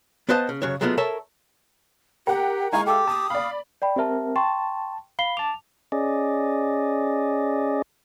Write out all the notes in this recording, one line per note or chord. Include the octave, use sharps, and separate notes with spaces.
B3 B4 C5 D#5 F5 A5
C#3
F#2 C#3 F#3 C#5
F#3 G#3 A3 B3 F4
A4 A#4 C#5 E5 A5
G4 A#4 F#5 G5
G#3 D#4 E4 F5 G#5 C#6
G4 A4 G5 D6 E6
A5 D#6
D5 F5 B5
D5 G5 B5
C4 G4 A#4 E5 A5
G5 A5 C6 C#6
F5 B5 C7 G7
A5 D6 F7
C#4 G#4 D5 D#5